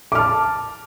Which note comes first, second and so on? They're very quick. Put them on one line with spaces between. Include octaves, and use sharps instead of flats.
D6 F6 A5